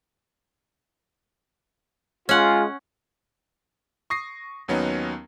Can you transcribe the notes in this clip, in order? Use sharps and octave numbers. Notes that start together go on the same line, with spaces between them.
G#3 C#4 F4 F#5
C#6 D#6 A#6 C7
D#2 F#3 B3 C#4 D#4